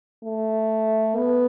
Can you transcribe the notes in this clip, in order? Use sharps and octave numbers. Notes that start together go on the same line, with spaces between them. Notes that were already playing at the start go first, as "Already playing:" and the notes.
A3
B3